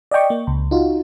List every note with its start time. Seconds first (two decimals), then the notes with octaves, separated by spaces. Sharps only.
0.11 D5 D#5 G5 C#6
0.30 A#3
0.47 C#2
0.71 D#4 F4 F#4